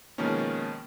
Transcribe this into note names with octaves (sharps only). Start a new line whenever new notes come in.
B2 D#3 F3 G#3 A#3 C#4